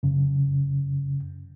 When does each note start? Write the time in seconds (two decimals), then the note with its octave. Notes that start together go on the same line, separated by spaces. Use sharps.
0.03 F#2 C#3